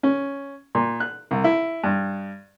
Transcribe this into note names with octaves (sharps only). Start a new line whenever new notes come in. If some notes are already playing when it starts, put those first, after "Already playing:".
C#4
A#2
F#6
C2
E4
G2